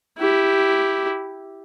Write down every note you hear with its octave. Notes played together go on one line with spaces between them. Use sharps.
E4 G4